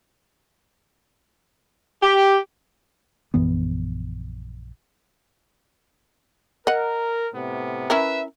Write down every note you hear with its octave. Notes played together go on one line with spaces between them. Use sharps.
G4
A#1 F#2 E3 B3
A#4 D#5 F#5
A2 C3 B3
C#4 E4 A#4 B4 E5